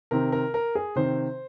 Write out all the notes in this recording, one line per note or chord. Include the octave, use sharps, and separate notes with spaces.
C3 D#3 C4 A#4
A#4
A#4
G#4
C3 D#3 C4 C5